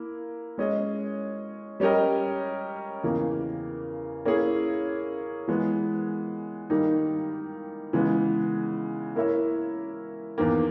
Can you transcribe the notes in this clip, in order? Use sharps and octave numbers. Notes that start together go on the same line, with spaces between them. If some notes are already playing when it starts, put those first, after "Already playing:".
Already playing: A#3 E4
G#3 C#4 G#4 D#5
G3 C#4 G4 A#4 D#5
E2 C#3 E3 A#3
A#3 C#4 E4 G#4
E3 G#3 B3
D#3 G3 A#3 D#4
C#3 E3 G#3 B3
A#3 E4 A#4 C#5 E5
E2 D#3 A#3